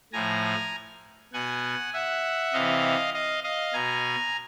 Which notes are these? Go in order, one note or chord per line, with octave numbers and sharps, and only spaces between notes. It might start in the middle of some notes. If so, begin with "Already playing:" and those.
A2 F3 G#5 A#5
B2 F#5 G#5
E5 F#5
C3 E3 D#5 F5
D#5 F5
D#5 F5
B2 G#5 A#5